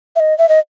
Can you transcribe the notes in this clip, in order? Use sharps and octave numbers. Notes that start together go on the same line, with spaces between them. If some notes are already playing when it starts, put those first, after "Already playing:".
E5
D#5
E5
D#5